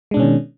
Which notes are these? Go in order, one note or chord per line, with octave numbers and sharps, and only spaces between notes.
B2 D#3 G#3 C#4 D4